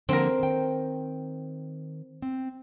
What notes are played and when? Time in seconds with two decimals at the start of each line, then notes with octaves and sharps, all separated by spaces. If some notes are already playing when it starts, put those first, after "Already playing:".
0.09 D3 F3 A#3 C4 A#4
0.40 D#3 G5
2.22 C4